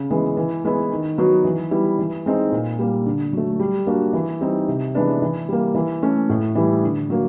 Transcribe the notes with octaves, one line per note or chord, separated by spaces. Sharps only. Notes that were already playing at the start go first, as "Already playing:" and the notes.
Already playing: C#3
E3 G#3 B3
E3
G#3 B3 E4
D#3
F#3 B3 D#4 F#4
E3
G3 B3 E4
E3
G#3 C4 D#4
A#2
G3 A#3
D3
F#3 A3
G3
A#3 D4 F#4
E3
G3 C4 D#4
C3
E3 G#3 B3 D4
E3
G3 A#3
E3
A3 C#4
A2
E3 G3
D3
F#3 A#3